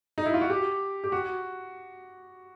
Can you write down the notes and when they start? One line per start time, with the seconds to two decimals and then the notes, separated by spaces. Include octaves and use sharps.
0.18 D#4
0.26 E4
0.34 F4
0.41 F#4
0.50 G4
1.04 G4
1.12 F#4